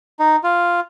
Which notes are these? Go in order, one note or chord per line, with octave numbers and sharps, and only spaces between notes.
D#4
F4